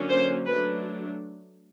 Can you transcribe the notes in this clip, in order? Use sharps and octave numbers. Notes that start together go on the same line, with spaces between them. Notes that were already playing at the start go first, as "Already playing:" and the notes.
Already playing: D3 F#3 A#3 C#4
C5
F#3 A3 D4 B4